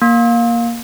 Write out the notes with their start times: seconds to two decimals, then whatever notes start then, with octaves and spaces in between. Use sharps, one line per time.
0.02 A#3